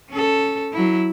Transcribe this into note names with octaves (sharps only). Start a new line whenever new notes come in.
C#4 A4
F#3 E4